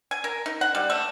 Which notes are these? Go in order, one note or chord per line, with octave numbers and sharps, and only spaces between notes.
G#5
A#4
D#4
F#5
G3
A3